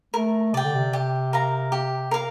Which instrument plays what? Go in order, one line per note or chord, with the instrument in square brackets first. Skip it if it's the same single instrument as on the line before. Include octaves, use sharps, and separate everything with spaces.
[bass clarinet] A3 [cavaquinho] A#4
[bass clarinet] C3 [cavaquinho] D5 G5
[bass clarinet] D3
C3
[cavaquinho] G4
A#4 F5 A#5
G4
A#4 F5 A#5